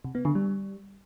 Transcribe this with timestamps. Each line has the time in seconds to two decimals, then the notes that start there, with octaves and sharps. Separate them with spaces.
0.05 C3
0.15 B3
0.25 D3
0.35 G3